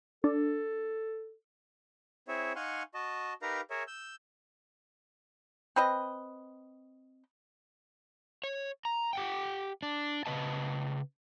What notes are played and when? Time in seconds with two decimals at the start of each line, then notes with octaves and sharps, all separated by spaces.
0.24 D4 A4
2.28 C4 E4 G#4 C#5 E5
2.56 D#4 F5 F#5 G#5 C6 C#6
2.94 F#4 D#5 A5
3.42 D#4 G4 A#4 B4 F5 A#5
3.70 G#4 A#4 C#5 E5
3.88 E6 G6
5.76 C4 B4 D#5
8.44 C#5
8.85 A#5
9.13 G4 F#5 G5
9.83 D4
10.26 C#3 B4 D#5 A5